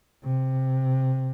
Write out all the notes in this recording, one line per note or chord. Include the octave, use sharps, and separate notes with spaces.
C3